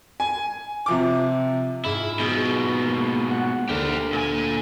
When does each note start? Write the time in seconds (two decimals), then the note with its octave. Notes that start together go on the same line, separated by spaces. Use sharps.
0.20 G#5
0.86 C3 F3 D6
1.85 G#2 E4 F4 E7
2.19 G#2 B2 G#3
2.85 A#3
3.31 F#5
3.69 D2 G4 A#4
4.13 A#2 G#5